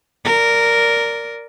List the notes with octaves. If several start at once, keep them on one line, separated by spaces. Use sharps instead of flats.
A#4 D5